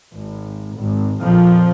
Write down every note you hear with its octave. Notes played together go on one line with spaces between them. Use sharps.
G#1
G#1
F2 A#2 F3